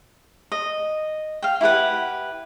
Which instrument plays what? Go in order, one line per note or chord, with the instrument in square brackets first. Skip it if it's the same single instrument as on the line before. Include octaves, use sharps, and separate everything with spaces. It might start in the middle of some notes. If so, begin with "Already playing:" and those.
[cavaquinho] D#5
F5 G5
E4 G4 B4 F#5